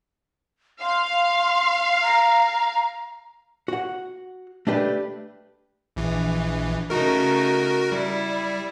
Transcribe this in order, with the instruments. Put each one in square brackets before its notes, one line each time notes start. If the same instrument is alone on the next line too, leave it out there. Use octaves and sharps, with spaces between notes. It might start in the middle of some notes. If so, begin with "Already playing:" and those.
[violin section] F5 [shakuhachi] C6
[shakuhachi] A#5
[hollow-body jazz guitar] F#4 F#5
A3 D4 G4 B4
[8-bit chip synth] A#1 E3
[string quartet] C#3 A3 D#4 [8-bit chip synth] F#4 A#4
[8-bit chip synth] G3 [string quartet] E4